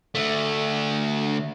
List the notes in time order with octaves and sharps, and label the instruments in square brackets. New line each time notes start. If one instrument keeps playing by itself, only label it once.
[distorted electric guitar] D3 A3